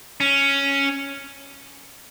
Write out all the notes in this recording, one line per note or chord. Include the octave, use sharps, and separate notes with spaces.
C#4